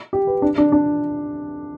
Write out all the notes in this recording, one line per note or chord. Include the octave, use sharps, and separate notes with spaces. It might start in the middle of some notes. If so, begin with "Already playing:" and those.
G4
B4
D4
D4
D4